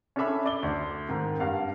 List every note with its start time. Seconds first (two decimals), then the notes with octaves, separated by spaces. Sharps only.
0.16 C#4 D4 E4 A4 E5 B5
0.46 D5 G7
0.63 D2
1.09 G#2 D#3
1.40 G2 F5 F#5